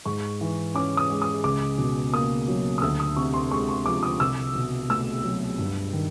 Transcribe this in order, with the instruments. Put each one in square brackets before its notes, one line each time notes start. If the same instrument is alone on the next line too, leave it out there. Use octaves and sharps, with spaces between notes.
[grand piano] G#2 [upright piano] C#6
[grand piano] E3
[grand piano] C#4 [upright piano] D6
[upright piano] D#6
[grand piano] G#3
[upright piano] D#6
[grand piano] C#2 [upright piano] D6
[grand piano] B2
[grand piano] A#3 [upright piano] D#6
[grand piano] F#3
[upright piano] D#6
[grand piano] D2 [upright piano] E6
[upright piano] D#6
[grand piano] C3 [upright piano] C#6
[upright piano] C6
[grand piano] G#3 [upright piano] C#6
[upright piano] C#6
[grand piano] F3 [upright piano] D6
[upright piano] D#6
[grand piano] C2 [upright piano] E6
[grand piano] B2
[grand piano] A3 [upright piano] E6
[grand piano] F#3
G2
D#3